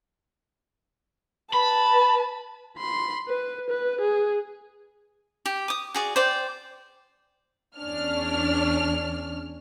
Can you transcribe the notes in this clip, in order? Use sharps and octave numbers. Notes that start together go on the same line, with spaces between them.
B4 A5 B5
B5 C6
B4
B4
G#4
G4
D6 D#6
F#4 G#4 D5
C5 D5 G5
E2 C#4 D4 F6